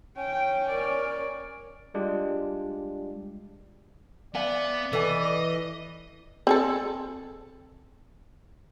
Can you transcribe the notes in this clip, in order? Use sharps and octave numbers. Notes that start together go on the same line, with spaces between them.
C#4 G5
A#4 C#5 D5
G3 G#3 D4 F4 G4
B3 D5 E5 F5 G#5
E3 A4 D#5 G#5
C4 G#4 A4